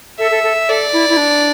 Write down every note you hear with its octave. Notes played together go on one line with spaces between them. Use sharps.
A4 E5
A4
A4
A4 D5
E4
E4
D4